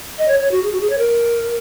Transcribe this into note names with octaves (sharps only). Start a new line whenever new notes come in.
D#5
C#5
C#5
F#4
G#4
F#4
G#4
C#5
A#4